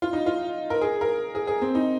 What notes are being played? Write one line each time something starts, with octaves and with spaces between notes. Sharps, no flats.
F4
D#4
F4
A#4
G#4
A#4
G#4
G#4
C4
D#4